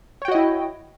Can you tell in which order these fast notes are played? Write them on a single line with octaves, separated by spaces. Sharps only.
C#5 G5 F#4 D#5 E4